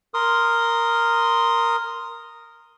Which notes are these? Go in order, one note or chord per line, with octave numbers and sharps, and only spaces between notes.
A#4 C6 D#6